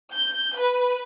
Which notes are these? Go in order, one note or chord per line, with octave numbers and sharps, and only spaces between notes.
G6
B4